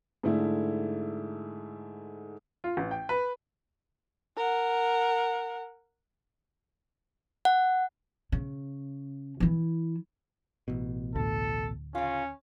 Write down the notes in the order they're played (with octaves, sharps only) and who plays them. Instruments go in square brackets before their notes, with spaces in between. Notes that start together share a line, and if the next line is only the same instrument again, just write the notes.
[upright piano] G#2 D3 A3 E4
[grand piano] F4
A1
G5
B4
[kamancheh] A#4 F#5
[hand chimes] F#5
[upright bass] C#3
E3 E4
[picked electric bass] A1 B2
[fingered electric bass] D2 A2 [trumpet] A4
[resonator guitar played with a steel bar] C#3 F4 [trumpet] C#4